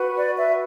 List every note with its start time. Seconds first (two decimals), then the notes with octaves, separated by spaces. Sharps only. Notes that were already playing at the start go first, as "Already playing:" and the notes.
Already playing: F#4 B4
0.16 D5
0.37 E5